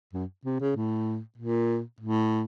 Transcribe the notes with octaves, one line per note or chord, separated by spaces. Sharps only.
F#2
C3
C#3
A2
A#2
A2